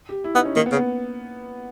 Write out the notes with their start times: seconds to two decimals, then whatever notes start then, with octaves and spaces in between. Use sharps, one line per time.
0.09 G4
0.24 E4
0.35 B3 D#4
0.45 C#4
0.56 D#3 A#3
0.66 B3
0.72 C#3
0.76 B3